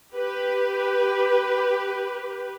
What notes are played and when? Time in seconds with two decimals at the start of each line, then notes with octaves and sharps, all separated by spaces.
0.14 G4 B4